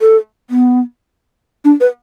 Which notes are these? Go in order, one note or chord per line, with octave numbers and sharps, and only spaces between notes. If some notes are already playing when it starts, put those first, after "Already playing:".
A4
B3
D4
B4